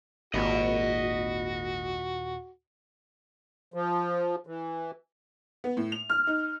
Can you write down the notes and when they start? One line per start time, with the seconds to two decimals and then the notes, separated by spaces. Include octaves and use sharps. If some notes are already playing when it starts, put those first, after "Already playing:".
0.34 G#1 D#2 A#2 F#4 D#5 B5
3.74 F3
4.47 E3
5.64 B3
5.77 A2
5.92 F7
6.10 F6
6.27 D#4